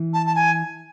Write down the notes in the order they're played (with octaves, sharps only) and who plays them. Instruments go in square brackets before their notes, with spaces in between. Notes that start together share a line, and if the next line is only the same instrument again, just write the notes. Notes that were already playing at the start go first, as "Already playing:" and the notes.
Already playing: [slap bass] E3
[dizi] A5
A5
G#5